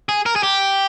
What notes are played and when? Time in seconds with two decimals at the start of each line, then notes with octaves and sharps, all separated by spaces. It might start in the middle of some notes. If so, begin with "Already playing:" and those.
0.09 G#4
0.26 A#4
0.36 G#4
0.43 G4